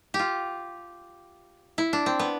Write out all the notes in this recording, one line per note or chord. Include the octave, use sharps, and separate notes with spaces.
G4
F4
E4
D4
C4
B3